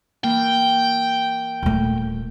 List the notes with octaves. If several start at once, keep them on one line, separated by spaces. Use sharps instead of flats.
E3 A#3 G5
D#1 A3